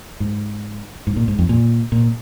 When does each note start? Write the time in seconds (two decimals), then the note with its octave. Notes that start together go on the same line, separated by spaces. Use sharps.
0.20 G#2
1.07 G#2
1.16 A#2
1.28 G#2
1.39 F2
1.49 A#2
1.92 A#2